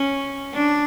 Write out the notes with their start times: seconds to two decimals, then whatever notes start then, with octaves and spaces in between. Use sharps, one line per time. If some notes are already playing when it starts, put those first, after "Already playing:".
Already playing: C#4
0.54 D4